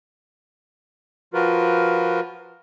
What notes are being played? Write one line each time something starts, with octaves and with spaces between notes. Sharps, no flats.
F3 F4 F#4 A#4 B4